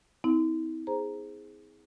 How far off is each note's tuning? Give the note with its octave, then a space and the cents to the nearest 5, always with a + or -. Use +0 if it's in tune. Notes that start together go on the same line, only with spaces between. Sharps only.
C4 -40 E4 -45
G#4 +0 C5 +0 A#5 +0